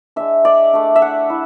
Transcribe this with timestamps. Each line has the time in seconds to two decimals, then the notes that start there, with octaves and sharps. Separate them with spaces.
0.16 G#3 D4 E5
0.45 D5
0.73 A3 D4
0.96 E5
1.02 F#5
1.30 E4